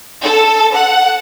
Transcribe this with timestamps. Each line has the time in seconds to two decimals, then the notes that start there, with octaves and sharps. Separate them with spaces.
0.23 A4
0.75 F#5